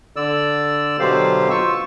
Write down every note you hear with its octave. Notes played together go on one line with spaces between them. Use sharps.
D3 D5 E6
B2 D3 F#3 G4 C5 F5
F4 C#6 E6